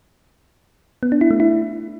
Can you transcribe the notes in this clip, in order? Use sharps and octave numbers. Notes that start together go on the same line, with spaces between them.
B3
D4
E4
A3
E4